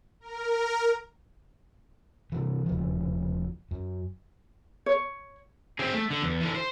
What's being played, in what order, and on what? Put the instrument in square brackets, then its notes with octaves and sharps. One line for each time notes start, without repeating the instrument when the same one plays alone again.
[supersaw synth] A#4
[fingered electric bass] C3 E3
E1 C#3 F3
F#2
[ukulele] C#5
[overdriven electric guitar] C4 G#4
A3
D3
E2
D3 E3
C5